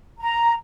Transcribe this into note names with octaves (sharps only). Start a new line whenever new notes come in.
A#5